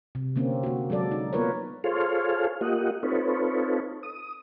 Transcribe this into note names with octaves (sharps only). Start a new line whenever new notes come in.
C3
D3 A#3 C4 C#4
A#3 F#4
F#3 G#3 A4 D5
D#4
A#3 B3 F4 A#4 B4 C#5
F4 G#4 A4 C5 C#5 F5
A#3 F4 G4 D#5 F#5
C4 D#4 F4 A4 B4 C#5
D#6